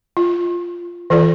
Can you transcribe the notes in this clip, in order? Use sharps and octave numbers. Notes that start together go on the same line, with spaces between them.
F4
E3 F4 A4 D5